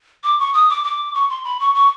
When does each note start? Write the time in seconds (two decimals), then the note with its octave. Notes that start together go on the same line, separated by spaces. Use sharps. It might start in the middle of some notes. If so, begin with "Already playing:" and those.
0.24 D6
0.39 C#6
0.54 D#6
0.70 D6
0.84 D6
1.14 C#6
1.30 C6
1.44 B5
1.60 C#6
1.75 C#6